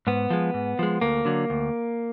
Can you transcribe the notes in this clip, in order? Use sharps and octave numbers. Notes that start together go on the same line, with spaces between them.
G#2 B3
F3 G#3
G#2
F3 G#3
D2 A#3
D3 F#3
D2